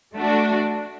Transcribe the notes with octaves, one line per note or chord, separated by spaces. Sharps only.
A3 D4 F#4